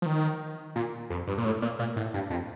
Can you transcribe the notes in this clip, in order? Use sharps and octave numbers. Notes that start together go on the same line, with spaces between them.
F3
D#3
A#2
F2
G2
A#2
A2
A#2
A#2
A2
G2
F2